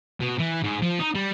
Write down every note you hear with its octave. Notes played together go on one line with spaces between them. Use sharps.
B2
E3
G#2
F3
D#4
G3